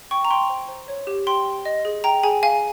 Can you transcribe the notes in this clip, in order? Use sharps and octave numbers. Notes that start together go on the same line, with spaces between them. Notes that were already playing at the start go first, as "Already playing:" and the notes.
G5 C#6
A#5
G5 C6
C5
C5
C#5
G4
G5 C6
G4
D#5
G#4
G5 A#5
G#4 G#5
F5 G#5